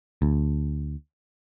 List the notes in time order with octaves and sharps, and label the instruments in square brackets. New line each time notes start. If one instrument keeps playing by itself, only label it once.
[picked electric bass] D2